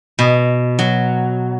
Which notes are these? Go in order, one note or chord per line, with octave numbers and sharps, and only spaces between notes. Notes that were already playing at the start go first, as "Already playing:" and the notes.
B2
F#3